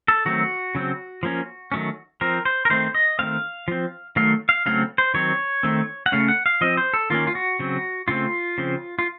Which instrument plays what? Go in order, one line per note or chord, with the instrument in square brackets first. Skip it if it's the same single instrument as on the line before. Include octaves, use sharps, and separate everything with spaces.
[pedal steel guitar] A4
D#3 F#3 A3 C4 F#4
C#3 F#3 C4
F3 A#3 C#4
D#3 F#3 A3 C#4
F3 C4 A#4
C5
A#4
D#3 A3 C4 C5
D#5
D#3 A3 C4 F5
F3 C4
D#3 F#3 A3 F5
F5
C#3 F#3 A3 C4 F5
C5
D#3 F#3 C4 C#5
D#3 A3 C4
F#5
C#3 A3 C#4 F5
F#5
F5
F3 C4 D#5
C5
A4
D#3 A#3 C#4 F4
F4
F#4
C#3 F#3 C4
C#3 A3 C4 F4
C#3 F3 C4
F4